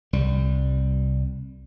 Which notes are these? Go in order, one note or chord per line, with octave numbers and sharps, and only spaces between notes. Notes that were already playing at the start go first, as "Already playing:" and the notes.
C2 G3